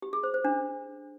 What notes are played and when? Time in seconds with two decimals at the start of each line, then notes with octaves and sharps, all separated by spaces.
0.02 G4
0.13 G#4
0.23 C5
0.34 C5
0.44 D4